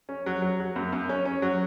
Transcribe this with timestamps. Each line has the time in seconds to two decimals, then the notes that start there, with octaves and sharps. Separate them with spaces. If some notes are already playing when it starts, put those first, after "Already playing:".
0.09 C#4
0.26 F#3
0.42 F#3
0.60 F#3
0.76 F#2
0.92 F#2
1.09 C#4
1.25 C#4
1.42 F#3